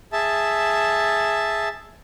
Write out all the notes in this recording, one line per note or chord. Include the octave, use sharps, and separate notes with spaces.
G#4 E5 A5